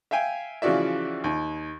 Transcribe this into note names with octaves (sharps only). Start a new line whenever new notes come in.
E5 F5 G5 G#5
C#3 E3 F3 F#4 D5 E5
D#2